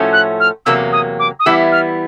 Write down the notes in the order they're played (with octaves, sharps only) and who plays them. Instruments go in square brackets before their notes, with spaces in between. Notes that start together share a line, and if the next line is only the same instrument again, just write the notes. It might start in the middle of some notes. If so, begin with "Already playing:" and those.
Already playing: [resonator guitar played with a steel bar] A2 F3 A3 C#4 F#4
[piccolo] F#6
F6
[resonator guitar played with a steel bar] E2 C3 F#3 A#3 [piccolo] E6
[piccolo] D#6
D6
D#6
[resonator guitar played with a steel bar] E3 G3 B3 E4 [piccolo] E6
[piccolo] F6